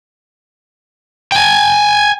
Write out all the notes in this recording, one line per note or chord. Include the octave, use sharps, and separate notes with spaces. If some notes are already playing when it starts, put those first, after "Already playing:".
G5 G#5